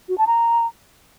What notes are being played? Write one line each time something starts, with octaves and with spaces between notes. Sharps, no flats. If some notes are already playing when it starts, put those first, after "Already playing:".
F#4
A5
A#5